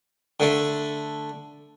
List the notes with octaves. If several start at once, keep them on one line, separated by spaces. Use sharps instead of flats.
D3 A3